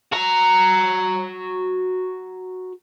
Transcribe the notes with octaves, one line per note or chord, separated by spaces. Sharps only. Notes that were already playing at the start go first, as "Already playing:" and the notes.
F#4 A#5